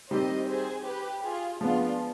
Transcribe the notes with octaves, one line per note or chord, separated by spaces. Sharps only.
D#3 G3 C4 G4 C5 D#5
G#4 C5
G4 B4
F4 G#4
F3 G#3 B3 D4 F4